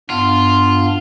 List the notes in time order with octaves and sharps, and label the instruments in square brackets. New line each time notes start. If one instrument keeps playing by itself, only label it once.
[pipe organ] G2 B3 D4 [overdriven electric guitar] F4